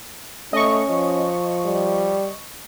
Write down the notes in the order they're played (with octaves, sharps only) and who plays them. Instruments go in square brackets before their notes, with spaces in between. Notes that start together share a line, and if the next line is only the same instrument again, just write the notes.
[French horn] A3 [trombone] C#4 [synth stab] D#5 C#6
[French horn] F3
[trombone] G3